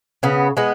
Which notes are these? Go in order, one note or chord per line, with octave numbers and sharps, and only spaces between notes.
C#3 B3
G#3 B3